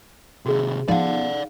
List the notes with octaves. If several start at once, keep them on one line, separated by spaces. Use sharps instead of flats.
C3 D#3 F#4 G#4
F3 B3 D#4 D5 F5 F#5